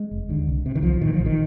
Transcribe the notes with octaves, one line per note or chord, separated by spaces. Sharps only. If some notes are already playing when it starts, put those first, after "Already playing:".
Already playing: G#3
F1
D#2 D3
C2
C3
D#3
C2 F3
A#2 D#3
F3
A#1
D#3